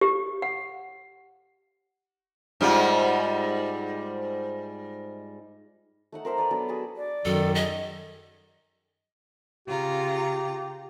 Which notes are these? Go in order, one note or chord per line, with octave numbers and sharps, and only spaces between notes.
G4
F#5
G#2 G3 F4
A3 D#4 F#5 A5
A#4 C5 E5 A#5
A4 B4 D5 A#5
F#3 B3 D4 A4
F#4 G#4 A5 B5
D5
F#2 D#3 F#3 A4
G#4 D#5
C#3 F4 G4 A#5